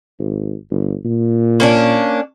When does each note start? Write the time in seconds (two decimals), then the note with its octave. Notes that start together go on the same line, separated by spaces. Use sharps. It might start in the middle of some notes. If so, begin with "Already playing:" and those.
0.19 G#1
0.71 G1
1.05 A#2
1.60 A#3 C#4 D4